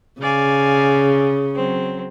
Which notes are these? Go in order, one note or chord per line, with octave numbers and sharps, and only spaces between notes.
C#3 D5 F5 G#5
F#3 C4